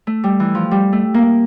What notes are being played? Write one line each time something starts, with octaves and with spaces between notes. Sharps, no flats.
A3
G3
E3
F3
G3
A3
A#3